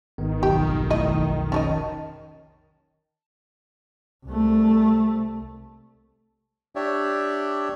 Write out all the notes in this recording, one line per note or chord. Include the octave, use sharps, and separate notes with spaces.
G#1 D#3 B3
F1 B1 G4
A3 E4 D#5
C#4 D#4 D#5 A5
C2 A3
D4 G4 C#5 D5 E5